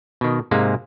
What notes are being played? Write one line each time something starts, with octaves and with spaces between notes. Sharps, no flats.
B2 D#3
G#2 C3 G#3 A#3